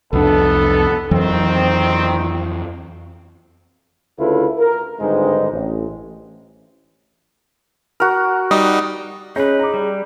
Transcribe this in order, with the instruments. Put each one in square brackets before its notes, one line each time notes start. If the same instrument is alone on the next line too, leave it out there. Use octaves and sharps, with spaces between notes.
[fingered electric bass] C2 F2 D4 [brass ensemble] B3 A4
[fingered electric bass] F2 E3 F#3 [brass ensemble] D#3 C4
[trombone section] D2 C#3 E4 F4 A4 B4
A#4
G#1 G2 D3 G#3 D#4 C5
A1
[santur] F#4 A#4
[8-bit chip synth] G3 D#4 [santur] D#5
[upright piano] C#4 [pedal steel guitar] D#4 B4 [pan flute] G#4
[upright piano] A#5 D6
[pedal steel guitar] G3